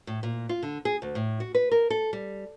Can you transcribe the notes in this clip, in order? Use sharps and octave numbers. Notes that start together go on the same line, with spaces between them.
A2
A#2
F4
D3
G#4
D2
A2
F#4
B4
A#4
A4
G3